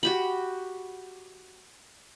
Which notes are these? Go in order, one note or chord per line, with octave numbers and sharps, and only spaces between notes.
F#4 G4 B5